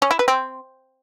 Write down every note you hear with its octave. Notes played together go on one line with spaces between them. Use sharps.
C#4
E4
B4
C4